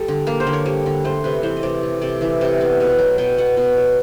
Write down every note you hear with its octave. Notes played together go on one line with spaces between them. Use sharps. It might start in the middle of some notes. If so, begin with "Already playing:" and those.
Already playing: G3 A4
D3
A#3 A#4
C5
D3
C#5
G3
D3
A3 C5
C3 B4
E3 C5
D#5
C3 D5
A3
C3 D5
E3 E5
C3
B3
B2
F#3
B2 G5
B3 F#5
B2
F#3